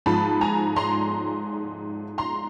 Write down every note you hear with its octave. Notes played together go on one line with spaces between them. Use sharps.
G#2 F3 A5 B5
G#5 A#5
A#5 C6
A#5 C6